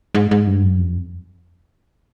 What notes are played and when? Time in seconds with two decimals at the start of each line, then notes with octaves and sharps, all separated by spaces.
0.15 G#2
0.31 G#2
0.47 G2
0.63 F#2
0.79 F2